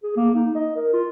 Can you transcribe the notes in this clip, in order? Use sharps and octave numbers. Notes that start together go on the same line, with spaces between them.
G#4
A#3
D#4
D#5
A#4
F4